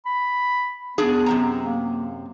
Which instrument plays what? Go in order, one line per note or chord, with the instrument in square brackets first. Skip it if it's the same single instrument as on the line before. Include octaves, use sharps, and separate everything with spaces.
[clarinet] B5
[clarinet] B3 [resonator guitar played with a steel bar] D4 G#4
[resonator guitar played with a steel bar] F#2 C3 A#5
[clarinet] A#3